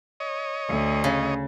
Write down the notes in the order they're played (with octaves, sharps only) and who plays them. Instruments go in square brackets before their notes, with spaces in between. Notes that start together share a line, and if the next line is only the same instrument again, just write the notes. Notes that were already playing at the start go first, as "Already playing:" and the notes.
[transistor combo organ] C#5 D#5
[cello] D2
[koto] C#3